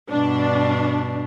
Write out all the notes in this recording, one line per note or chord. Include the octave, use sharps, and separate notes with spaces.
G2 B2 D4